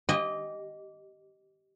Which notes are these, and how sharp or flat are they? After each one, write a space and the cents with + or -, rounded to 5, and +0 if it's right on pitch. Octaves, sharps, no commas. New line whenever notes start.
G4 -20 D#5 +0 G#5 -40